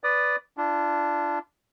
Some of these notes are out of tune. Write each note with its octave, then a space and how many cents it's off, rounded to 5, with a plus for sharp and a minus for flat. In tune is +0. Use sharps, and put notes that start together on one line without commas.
B4 +5 D5 -10 D#6 -20
D4 +0 F4 -40